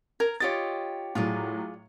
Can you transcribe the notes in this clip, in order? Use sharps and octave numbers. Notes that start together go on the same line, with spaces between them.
A#4 A#5 G#6
F4 G4 C#5 D#5 A6
A2 F#3 F4 G#4 D5